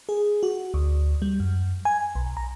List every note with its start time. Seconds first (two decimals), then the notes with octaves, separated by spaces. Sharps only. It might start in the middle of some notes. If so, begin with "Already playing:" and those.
0.09 G#4
0.43 F#4
0.74 D2
1.22 G3
1.40 F#2
1.85 G#5
2.15 B1
2.37 A#5